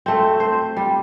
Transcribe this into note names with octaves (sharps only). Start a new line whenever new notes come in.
A3 C4
C5
G3